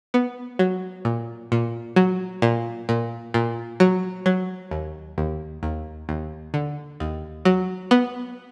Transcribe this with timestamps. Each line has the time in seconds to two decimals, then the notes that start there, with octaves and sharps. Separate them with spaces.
0.14 B3
0.59 F#3
1.05 A#2
1.52 A#2
1.96 F#3
2.42 A#2
2.89 A#2
3.34 A#2
3.80 F#3
4.26 F#3
4.71 D#2
5.18 D#2
5.63 D#2
6.09 D#2
6.54 D3
7.00 D#2
7.45 F#3
7.91 B3